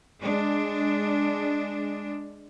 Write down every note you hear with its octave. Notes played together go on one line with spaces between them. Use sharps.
G#3 D4